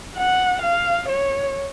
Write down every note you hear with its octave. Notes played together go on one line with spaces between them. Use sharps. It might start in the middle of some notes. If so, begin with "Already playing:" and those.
F#5
F5
C#5